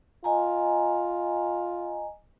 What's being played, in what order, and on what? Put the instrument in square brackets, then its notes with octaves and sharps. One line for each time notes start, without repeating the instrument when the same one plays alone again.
[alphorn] F4 [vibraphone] D#5 G#5 A#5